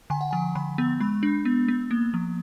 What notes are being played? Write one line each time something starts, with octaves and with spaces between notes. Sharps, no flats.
D3 G#5
F#5
F3 G#5
D3 B5
B3
G#3 B5
D4
B3
B3
A#3
F3